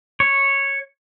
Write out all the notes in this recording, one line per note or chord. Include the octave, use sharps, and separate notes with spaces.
C#5